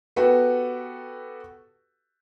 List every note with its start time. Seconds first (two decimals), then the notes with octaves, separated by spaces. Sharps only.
0.16 B3 F#4 G4 A4 B4